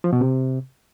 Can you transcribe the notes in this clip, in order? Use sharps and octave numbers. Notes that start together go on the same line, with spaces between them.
F3
B2
C3